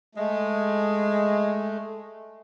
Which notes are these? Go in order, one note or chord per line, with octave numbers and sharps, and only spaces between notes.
G#3 A3